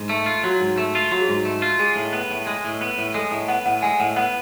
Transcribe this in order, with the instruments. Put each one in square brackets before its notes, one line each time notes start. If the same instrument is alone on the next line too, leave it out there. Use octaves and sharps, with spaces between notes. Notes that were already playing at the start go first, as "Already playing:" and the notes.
Already playing: [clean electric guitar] G#2
A3
F4
[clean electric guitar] F#3 [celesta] F#4
[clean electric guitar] G#2
A3
F4
[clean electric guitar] F#3 [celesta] F#4
[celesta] G#4
[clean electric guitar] G#2 [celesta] F#4
[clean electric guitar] A3
F4
[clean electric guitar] G#3 [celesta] G#4
[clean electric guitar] A2
B3
A2
G#3
A2
B3
A2
[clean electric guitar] G#3 [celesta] A4
[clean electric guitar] A2
[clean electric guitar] B3 [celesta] F#5
[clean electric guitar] A2 [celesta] F#5
[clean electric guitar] G#3 [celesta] G#5
[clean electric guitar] A2 [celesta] F#5
[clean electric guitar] B3 [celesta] F#5